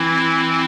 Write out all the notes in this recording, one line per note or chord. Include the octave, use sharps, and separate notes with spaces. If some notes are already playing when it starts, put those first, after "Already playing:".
Already playing: E3 C4 E4